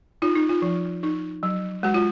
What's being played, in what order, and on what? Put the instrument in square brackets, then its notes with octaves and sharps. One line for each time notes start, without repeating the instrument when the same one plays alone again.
[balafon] D#4 F4
D#4
F4
F3
D#4
F#3
G#3 F#4
F4